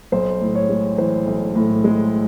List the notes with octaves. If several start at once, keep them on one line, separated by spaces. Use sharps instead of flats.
B1 C5
A2
C#5
G#3
E3 C5
B1
A2
G#3